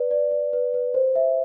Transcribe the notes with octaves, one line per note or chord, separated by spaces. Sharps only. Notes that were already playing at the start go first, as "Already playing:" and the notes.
Already playing: B4 D5
D5
D5
B4
B4
C5
E5